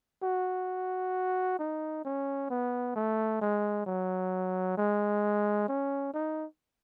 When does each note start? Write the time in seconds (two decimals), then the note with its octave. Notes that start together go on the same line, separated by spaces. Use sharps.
0.23 F#4
1.59 D#4
2.05 C#4
2.50 B3
2.96 A3
3.41 G#3
3.86 F#3
4.77 G#3
5.68 C#4
6.14 D#4